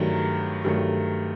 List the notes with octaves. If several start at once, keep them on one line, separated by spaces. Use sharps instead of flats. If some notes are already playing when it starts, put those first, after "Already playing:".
Already playing: G2 D#3 F#3 A3
G2 D#3 F#3 A3